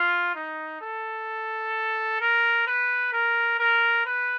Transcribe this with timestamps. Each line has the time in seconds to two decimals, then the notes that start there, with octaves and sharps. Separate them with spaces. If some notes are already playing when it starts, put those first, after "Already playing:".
Already playing: F4
0.35 D#4
0.81 A4
2.21 A#4
2.67 B4
3.13 A#4
3.59 A#4
4.06 B4